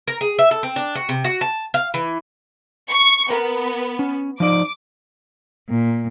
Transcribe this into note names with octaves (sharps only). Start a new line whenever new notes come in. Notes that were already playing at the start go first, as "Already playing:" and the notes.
A#4
G#4
E5
A4
C4
D4
F#4
C3
F#4
A5
F5
E3
C#6
B3 A#4
C#4
F3 D#4 D5 D6
A#2